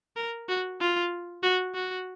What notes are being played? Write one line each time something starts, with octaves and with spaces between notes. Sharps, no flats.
A#4
F#4
F4
F#4
F#4